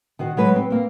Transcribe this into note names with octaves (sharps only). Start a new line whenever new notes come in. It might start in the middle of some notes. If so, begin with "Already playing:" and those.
D#3 F#4 C5
F#3 G#3 B4
F#3 C4
A#3 C4